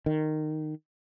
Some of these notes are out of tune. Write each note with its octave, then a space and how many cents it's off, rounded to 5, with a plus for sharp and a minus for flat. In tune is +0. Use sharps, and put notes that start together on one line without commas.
D#3 -10